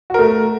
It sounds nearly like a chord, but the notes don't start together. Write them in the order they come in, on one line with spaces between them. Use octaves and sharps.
F#4 A#4 A3